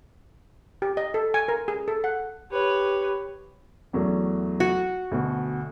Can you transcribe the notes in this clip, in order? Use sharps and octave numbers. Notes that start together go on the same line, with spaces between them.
G4
D#5
A4
G#5
A#4
G#4
A4
F#5
G4 B4 C#5
E2 F#3 A3
F#4
D2 B2